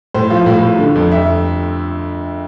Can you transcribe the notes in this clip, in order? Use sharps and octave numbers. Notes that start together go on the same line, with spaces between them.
A2 C5
F3
A2
A2
D3
F2
F2 E5